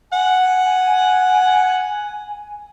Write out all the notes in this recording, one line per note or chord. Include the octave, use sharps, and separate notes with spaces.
F#5 G#5